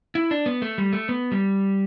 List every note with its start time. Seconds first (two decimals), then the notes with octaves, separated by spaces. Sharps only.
0.15 E4
0.31 D4
0.46 B3
0.62 A3
0.78 G3
0.93 A3
1.09 B3
1.32 G3